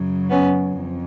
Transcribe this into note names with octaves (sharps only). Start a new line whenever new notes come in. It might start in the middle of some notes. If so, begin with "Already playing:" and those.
Already playing: F#2 C#3 F#3
B3 C#4
F2